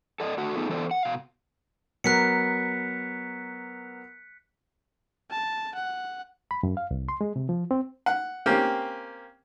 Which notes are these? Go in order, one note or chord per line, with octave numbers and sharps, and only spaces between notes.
A4 D5 D#5
A3 D4 F#4
A3 B3 D#4 F4 G#4 A4
E3 B3 A4 C5 D5
F#5
B2 F5
F#3 B3 A#4 F#6 B6 C#7
A5
F#5
B5
F#2
F5
C2
C6
G#3
C3
F3
C4
F#5
A#3 C4 C#4 G4